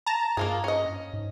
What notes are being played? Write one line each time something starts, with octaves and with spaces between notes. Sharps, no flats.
A5 A#5
G2 A#3 F4 G#4
C#4 D#5
G#2